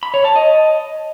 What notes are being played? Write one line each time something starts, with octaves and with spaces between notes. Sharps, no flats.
B5
C#5
A5
D#5